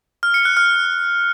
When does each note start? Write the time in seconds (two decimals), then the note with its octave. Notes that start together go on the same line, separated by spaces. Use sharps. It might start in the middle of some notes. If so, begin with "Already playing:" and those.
0.23 F6
0.34 C#7
0.45 F#6
0.57 F6